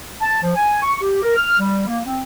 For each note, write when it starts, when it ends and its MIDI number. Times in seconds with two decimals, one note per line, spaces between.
0.21 0.37 81
0.42 0.53 53
0.55 0.81 80
0.83 0.99 85
1.01 1.20 67
1.22 1.33 70
1.36 1.55 89
1.59 1.84 55
1.87 1.98 58
2.04 2.22 60